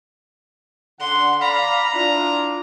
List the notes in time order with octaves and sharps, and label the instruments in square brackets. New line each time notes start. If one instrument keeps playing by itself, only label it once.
[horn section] D3 F#5 [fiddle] C6
[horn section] D5 F5 B5 [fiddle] A#5
[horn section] D4 E4 F4